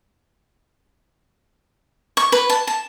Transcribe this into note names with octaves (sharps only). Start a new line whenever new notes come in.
C#6
B4
A5
A5